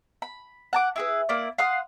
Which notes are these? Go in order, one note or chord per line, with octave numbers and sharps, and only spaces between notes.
B5
F#5 A5 D6
E4 G#4 B4
A#3 E4 D5
F5 F#5 C6 D#6